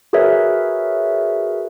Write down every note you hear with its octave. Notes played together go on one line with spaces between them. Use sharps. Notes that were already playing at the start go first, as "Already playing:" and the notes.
F#4 G#4 A#4 B4 C#5 E5